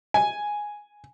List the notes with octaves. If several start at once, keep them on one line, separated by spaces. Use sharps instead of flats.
G#5